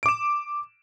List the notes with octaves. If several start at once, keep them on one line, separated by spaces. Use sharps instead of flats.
D6 D7 E7